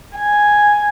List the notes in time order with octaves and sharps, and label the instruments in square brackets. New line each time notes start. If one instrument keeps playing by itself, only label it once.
[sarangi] G#5